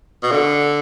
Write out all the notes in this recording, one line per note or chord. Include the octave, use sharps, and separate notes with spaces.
B2
D3